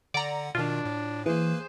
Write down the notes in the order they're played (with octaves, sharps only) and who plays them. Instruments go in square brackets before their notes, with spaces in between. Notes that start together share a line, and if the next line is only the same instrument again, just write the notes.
[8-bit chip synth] D3 F#5 [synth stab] D5 A#5
[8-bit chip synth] B2 D#3 [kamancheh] D4 [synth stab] F4
[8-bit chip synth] A2
[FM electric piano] E3 [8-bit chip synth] A#3 B4 [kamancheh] G#4 C5